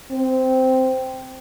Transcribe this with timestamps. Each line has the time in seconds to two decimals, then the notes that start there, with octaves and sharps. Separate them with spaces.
0.11 C4